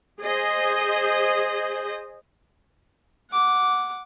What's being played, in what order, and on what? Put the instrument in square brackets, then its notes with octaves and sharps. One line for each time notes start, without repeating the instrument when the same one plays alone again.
[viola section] G#4 C5 D#5
[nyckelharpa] F#5 D6